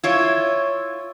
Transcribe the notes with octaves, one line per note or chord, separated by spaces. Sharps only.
E4 F4 C#5